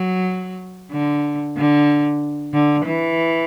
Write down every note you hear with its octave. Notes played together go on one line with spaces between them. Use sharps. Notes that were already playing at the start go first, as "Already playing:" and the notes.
Already playing: F#3
D3
D3
D3
E3